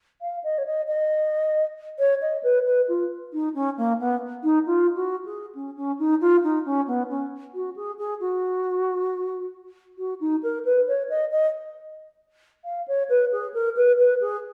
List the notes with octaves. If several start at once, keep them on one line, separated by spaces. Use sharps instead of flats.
F5
D#5
C#5
D#5
D#5
C#5
D#5
B4
B4
F4
D#4
C#4
A#3
B3
D#4
F4
F#4
G#4
C#4
C#4
D#4
F4
D#4
C#4
B3
C#4
F#4
G#4
G#4
F#4
F#4
D#4
A#4
B4
C#5
D#5
D#5
F5
C#5
B4
G#4
A#4
B4
B4
G#4